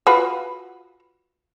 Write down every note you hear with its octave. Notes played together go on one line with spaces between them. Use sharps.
F4 F#4 B4